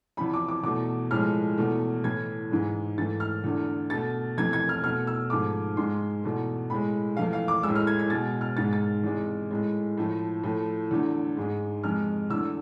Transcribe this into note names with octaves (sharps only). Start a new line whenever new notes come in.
E2 C3 F3 B5
D6
D6
E2 B2 A3 D6
A2 F3 G#3 F6
E2 B2 A3
A2 E3 A3 G#6
G#2 E3 G#3
G#2 E3 A3 A6
F6
E2 D3 A3
B2 A3 A6
F2 C3 E3 A3 G#6
G#6
F6
B2 A3 F6
E6
G#2 F3 A3 D6
G#2 G#3 C6
E2 B2 A3
A2 G#3 B5
F2 E3 A3 F5
F5
D6
G#3 E6
A2
F6
G#6
G#6
B2 G#3 A6
F6
G#2 G#3 A6
A6
E2 C3 G#3
A2 G#3
A2 F3 A3
A2 F3 A3
E2 D3 A3
G#2 G#3
F2 C3 G#3 F6
E2 D3 A3 E6